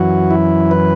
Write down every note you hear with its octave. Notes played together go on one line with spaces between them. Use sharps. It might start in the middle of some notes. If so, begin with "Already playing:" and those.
Already playing: F#2 E3 F#4
E4
B4